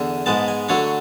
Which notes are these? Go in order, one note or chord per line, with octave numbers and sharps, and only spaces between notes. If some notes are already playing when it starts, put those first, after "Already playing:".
Already playing: E2 D3
G#2 G#3 B3 A5
G#5
D3 F#3 A3 D4 C#5